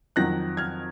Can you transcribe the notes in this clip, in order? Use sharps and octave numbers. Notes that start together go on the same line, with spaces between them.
F2 D#3 F#3 F#6 A#6
F6 G#6